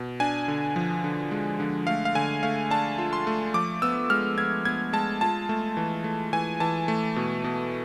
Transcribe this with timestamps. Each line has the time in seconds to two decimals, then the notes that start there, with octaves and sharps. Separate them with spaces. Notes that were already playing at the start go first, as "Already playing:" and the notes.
Already playing: B2
0.20 D4 G#5
0.48 D3
0.76 F3
1.04 D3
1.31 G#3
1.60 D3
1.87 A3 F5
2.05 F5
2.15 D3 G#5
2.43 A3 F5
2.71 D4 A5
2.98 F4
3.13 C6
3.27 A3
3.54 F3 D6
3.82 B3 E6
4.10 G#3 F6
4.38 B3 G#6
4.65 B3 G#6
4.93 G#3 A5
5.21 F4 A5
5.49 A3
5.77 E3
6.04 A3
6.33 E3 G#5
6.60 E3 A5
6.88 A3
7.16 B2
7.44 B2